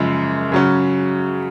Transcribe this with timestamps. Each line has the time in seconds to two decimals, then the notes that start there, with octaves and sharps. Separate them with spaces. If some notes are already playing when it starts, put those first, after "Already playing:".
Already playing: F#2 C#3 F3 G#3
0.52 C#3 F#3 C#4